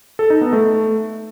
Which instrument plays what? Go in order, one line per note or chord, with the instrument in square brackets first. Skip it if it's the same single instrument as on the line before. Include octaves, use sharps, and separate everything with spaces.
[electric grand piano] A4
D#4
B3
A3